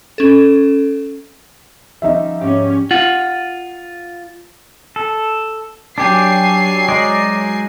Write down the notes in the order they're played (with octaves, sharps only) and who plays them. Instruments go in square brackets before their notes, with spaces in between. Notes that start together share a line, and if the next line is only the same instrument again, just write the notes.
[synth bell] C#4 A4
[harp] F3 G3 C#4 [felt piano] D#4 E5
[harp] G#2 G4 D5 [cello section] C#4
[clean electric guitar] F4 F#5
[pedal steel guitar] A4
[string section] F#3 G#5 C7 [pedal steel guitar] D4 G4
[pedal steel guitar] G#3 D#4 D5